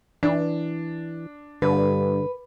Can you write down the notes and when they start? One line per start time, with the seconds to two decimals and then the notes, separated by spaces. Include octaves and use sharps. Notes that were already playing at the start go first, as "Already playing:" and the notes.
0.23 E3 D4
1.62 G2 D3 B4